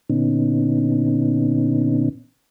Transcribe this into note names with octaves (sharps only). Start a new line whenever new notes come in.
A#2 D3 B3 C#4 D#4